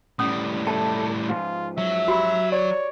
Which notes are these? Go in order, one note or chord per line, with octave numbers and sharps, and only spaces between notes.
A2 G3 C#4 D#6
E4 A4 A5
G#2 F3 F4
F#3 E5
F#4 G4 B5
C#5 D5